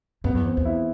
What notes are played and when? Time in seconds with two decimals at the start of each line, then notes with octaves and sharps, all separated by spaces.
0.24 F#2 B3
0.34 E2
0.45 C4
0.57 E2
0.65 E4